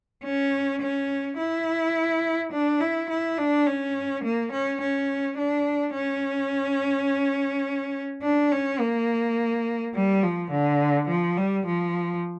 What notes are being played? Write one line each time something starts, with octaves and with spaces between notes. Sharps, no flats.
C#4
C#4
E4
D4
E4
E4
D4
C#4
A#3
C#4
C#4
D4
C#4
D4
C#4
A#3
G3
F3
D3
F3
G3
F3